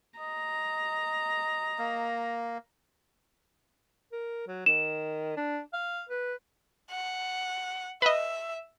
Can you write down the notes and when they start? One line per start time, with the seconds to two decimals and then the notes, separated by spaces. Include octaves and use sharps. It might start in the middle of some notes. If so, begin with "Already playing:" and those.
0.19 D#5 A#5
1.78 A#3
4.12 A#4
4.47 F#3
4.66 D#3 E7
5.37 D4
5.73 F5
6.09 B4
6.90 F#5
8.02 B4 D#5 E5